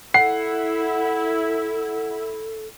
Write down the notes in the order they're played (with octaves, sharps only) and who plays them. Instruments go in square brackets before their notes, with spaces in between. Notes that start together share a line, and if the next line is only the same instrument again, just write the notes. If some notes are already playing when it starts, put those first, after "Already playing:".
[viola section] E4 [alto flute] A4 [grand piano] F#5 [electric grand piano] C7